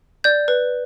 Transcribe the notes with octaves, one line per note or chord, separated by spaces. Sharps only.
D5 G6
B4